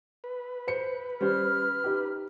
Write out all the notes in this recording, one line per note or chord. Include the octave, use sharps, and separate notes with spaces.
B4
C5 C#7
G3 C#4 C5 F6
D#4 G4